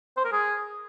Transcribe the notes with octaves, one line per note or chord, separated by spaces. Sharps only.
C5
A#4
G#4